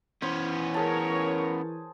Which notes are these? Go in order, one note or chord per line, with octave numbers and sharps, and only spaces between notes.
E3 B3 C#4 C5
G#4 A#4 C#5 A5